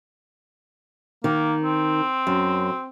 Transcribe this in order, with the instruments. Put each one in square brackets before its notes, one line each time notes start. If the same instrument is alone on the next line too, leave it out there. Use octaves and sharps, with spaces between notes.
[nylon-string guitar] D#3 [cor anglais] A#3
[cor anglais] C4
[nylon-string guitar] F#2